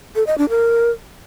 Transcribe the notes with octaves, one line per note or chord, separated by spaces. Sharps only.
A4
D#5
D4
A#4